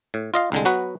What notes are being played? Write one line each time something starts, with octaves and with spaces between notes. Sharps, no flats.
A2
F4 D#5 F5
C2 D3 G#3
F#3 B3 F#4 B4